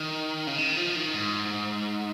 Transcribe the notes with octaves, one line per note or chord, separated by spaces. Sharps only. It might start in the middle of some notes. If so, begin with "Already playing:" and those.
Already playing: D#3
C#3
D#3
F3
D#3
G#2